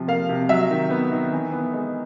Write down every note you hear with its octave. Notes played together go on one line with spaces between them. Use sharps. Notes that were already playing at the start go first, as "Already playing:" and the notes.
Already playing: C3 F3
A#3 F5
C3
F#3 E5
D#3
B3
D#3
E3
B3
G#3